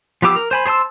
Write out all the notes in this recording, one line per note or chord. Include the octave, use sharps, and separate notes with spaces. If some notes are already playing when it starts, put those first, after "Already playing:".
F3 B3 G4 D6 E6
A#4
C5 G#5 B5
G#4 C5 A5 C6 E6